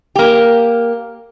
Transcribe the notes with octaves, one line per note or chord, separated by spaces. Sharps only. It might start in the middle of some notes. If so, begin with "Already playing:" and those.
A#3 G4